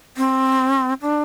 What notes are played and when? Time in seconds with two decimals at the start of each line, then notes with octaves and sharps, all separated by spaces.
0.17 C4
1.02 D4